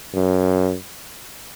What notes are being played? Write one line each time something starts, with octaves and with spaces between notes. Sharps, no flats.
F#2